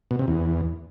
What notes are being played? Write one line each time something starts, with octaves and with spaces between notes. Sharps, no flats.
B2
C3
E2